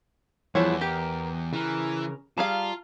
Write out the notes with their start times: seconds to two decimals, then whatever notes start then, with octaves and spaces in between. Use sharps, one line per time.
0.55 E2 F3 G3 E4 G#4 C#5 F#5
0.81 G4 A#4
1.53 C#3 E3 A#4
2.38 G3 F4 G#4 F5 A5 A#5 F6